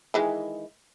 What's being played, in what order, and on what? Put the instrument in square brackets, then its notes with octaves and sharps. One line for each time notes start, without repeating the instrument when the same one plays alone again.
[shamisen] D#3 E3 G#3